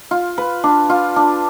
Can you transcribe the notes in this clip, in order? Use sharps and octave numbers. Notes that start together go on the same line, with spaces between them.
F4
B4
D4
F4
D4